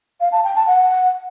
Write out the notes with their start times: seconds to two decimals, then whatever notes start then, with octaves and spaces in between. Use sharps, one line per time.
0.20 F5
0.32 A5
0.43 G5
0.55 A5
0.67 F#5